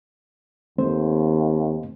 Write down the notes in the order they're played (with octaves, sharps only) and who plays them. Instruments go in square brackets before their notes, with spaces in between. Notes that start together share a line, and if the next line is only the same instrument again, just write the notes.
[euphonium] D#2 [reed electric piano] A3 C4 C5